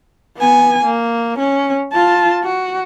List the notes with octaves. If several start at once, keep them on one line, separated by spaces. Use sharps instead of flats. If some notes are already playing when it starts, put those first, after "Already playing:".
B3 G#5
A#3
C#4
F4 A5
F#4